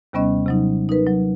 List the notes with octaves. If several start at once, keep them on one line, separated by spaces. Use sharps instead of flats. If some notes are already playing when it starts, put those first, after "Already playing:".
D#2 C3 G3 B3 C#4 D#5
C3 F#3 D#4
D#4 A#4 B4
F#3